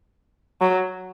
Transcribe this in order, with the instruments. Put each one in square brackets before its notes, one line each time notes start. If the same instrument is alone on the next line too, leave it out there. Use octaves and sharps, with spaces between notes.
[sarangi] F#3